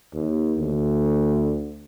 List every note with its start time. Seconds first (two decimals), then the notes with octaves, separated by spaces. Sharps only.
0.14 D#2
0.58 D2